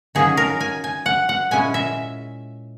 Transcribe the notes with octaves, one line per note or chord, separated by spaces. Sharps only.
D#3 F#3 A#3 C#4 G#4
A#4
G#5
G#5
F#5
F#5
A#2 G#3 C#4 E4 G#5
E5